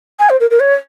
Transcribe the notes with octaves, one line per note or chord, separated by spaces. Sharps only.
G#5
C5
A#4
A#4
C#5